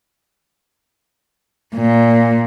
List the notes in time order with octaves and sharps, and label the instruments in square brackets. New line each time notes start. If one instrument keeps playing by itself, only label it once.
[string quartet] A#2